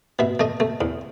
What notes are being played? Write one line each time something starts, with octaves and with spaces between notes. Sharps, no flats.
B2 E5
A3 D#5
A3
E2